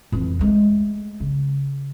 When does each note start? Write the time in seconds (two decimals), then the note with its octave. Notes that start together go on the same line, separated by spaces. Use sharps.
0.12 F2 E3
0.39 G#3 A3
1.20 C#3